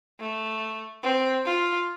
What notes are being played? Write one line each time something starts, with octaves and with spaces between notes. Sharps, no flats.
A3
C4
F4